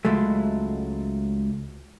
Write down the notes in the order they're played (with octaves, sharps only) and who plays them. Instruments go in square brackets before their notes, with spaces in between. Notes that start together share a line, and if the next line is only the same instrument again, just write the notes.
[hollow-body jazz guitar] C#2 F#3 G#3 A3